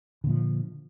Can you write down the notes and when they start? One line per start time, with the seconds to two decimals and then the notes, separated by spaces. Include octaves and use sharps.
0.24 D3
0.26 A#2
0.29 F3